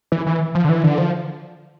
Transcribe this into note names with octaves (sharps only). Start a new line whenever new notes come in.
E3
E3
F3
D3
E3
D3
F3